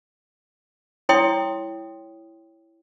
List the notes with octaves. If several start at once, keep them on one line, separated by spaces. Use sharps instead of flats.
E4 C#5 G5 C6 D#6